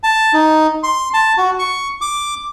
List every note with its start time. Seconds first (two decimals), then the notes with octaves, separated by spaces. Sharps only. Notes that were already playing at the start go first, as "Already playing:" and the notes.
0.03 A5
0.33 D#4
0.83 C6
1.14 A5
1.38 F#4
1.59 C#6
2.01 D6